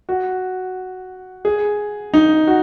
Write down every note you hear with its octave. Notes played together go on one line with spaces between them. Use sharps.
F#4
G#4
D#4
F#4